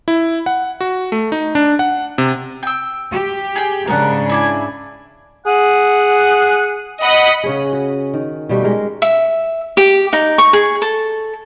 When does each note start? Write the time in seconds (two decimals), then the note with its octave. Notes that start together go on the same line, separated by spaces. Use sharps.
0.08 E4
0.46 F#5
0.81 F#4
1.12 A3
1.32 D#4
1.55 D4
1.79 F#5
2.18 C3
2.63 G5 E6
3.11 G4
3.56 G#4 G5
3.87 G#2 C#3 D4 A#4 F#5
4.30 E4 D5 G#5
5.46 G#4 F#5
7.03 D#5 F#5 B5
7.44 C#3 C#4 G#4
7.73 F#4
8.14 D#3
8.49 B2 G3 A3 G4
8.63 G#3 A#4
9.02 E5
9.77 G4
10.13 D#4
10.38 C#6
10.53 G#4
10.82 A4